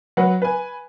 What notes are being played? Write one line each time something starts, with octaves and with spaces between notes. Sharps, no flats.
F#3 B4 F#5
B4 G#5